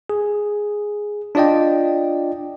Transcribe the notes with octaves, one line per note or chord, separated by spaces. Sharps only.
G#4
D4 F4 D5 D#5 G5